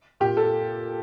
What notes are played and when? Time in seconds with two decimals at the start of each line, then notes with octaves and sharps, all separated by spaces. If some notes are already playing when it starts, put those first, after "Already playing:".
0.20 A#2 G4
0.37 A4